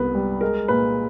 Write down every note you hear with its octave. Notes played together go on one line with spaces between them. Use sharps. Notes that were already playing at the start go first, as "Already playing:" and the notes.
Already playing: C2 B3 B4
G3
G#3 A#4
A#2 B4